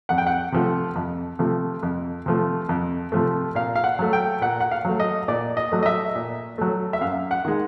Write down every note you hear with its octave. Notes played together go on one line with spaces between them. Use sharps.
F2 F#5
G5
F#5
C3 F3 A3
F2
C3 F3 A3
F2
C3 F3 A3
F2
C3 F3 A3
A#2 F5
F5
F#5
F#3 A3
G5
A#2 F#5
F#5
F5
F#3 A3
D#5
A#2 D5
D#5
F#3 A3
D#5
E5
A#2
F#3 A3
E5
F#2 F5
F#5
D#3 G#3